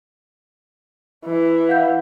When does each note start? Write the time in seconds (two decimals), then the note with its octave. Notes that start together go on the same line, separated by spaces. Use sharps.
1.26 E3
1.69 F5 F#5 G6